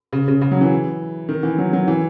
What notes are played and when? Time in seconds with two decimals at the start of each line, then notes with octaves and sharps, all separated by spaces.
0.13 C#3
0.28 C#3
0.41 C#3
0.51 F#3
0.61 E3
1.29 D#3
1.43 E3
1.58 F#3
1.73 F#3
1.88 E3